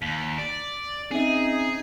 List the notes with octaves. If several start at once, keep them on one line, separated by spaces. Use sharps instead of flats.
D#2 B6
D5
C4 C#4 D#4 G#4 E5